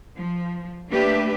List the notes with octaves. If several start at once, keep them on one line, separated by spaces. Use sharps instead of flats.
F3
A3 A#3 D4 G4 B4 E5